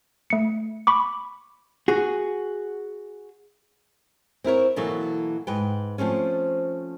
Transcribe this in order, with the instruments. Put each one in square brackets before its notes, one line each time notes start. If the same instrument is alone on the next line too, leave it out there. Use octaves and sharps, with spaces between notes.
[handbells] A3 C#7
B5 C#6 D6
[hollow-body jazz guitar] F#4 G#4
[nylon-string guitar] C4 E4 A#4 C#5
B2 E3 F#3 A#3 F#4 A4
G#2 B4 G5
F3 A3 C4 C#4